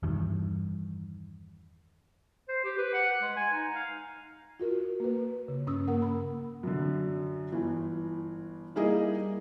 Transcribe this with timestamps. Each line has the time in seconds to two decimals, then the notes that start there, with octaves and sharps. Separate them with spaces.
0.03 E2 G2 D#3
2.49 C5
2.64 G4
2.78 B4
2.94 F#5
3.22 G#3
3.36 G#5
3.53 D#4
3.75 F5
4.60 F4 F#4 A#4
5.00 A#3 B4
5.48 C#3
5.67 G2 C#4 D#6 E6
5.87 A#3 A#4 F#5
6.02 B5
6.63 F#2 D3
7.52 G1 E3
8.76 G3 A#3 D#4 E4 G#4 D#5